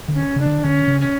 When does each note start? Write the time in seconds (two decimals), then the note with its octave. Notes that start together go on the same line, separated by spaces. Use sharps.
0.08 D3
0.15 C#4
0.36 C#3 D4
0.46 D3
0.64 D3 C#4
0.88 C#3
1.01 C#4